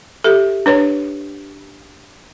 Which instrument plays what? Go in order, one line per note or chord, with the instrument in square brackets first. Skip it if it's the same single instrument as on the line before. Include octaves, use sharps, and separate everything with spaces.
[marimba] G4 E5 [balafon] A4
[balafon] D4 B4 C#5